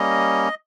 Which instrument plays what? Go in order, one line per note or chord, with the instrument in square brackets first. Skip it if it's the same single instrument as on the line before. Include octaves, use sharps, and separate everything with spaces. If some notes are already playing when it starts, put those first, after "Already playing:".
Already playing: [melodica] G3 A#3 C#4 D#5